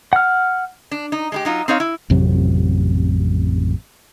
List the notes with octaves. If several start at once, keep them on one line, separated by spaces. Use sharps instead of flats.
F#5 F6
D4
D#4
G#3 D#4 G4
F#3 D#4 F4
C4 D#4 C#5 F5
E4
A1 F2 C3 F#3